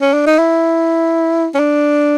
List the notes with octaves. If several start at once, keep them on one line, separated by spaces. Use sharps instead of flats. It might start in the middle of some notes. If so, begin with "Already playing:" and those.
C#4
D4
D#4
E4
C#4
D4